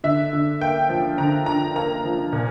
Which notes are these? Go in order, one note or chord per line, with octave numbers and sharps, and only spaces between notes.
D3 E5
D3
A#3 G5
F3
D3 A#5
D3 A#5
A#3 A#5
F3
A#2